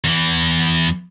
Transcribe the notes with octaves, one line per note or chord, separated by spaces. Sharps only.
E2 E3